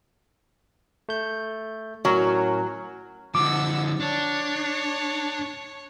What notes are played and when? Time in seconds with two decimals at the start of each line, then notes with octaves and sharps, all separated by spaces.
1.09 A3 G6
2.05 A2 F#3 C#4 A#4
3.35 D3 F3 F#5 D6 E6
4.00 D4 C#5